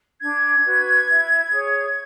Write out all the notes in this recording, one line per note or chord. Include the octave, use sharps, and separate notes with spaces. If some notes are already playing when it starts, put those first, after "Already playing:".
D4 G#6
F#4 B4
E4
G#4 C#5